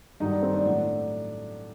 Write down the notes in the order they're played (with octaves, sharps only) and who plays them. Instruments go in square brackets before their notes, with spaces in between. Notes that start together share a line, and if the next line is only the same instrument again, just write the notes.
[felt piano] G2 D#3 F#3 D#4
D4
C4
D4
A2 F#3